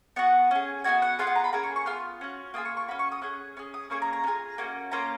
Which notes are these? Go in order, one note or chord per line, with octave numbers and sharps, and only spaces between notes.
B3 F#4 F#5
C#4 G#4
B3 D#4 F#4 G#5
F#5
B3 F4 G#4 F5
F#5
A#5
B5
A#3 C#4 G#4 A#5
C#6
C#6
B3 F4 F6
C#4 F#4
A#3 F4 G#4 D#6
C#6
C#6
C#4 F#4 B5
C#6
D#6
C#4 G#4 F#6
C#4 G#4 F6
D#6
A#3 C#4 G#4 C#6
A#5
A#5
C#4
F4 G#4
A#3 C#4 F#4
A#3 C#4 F4 A#5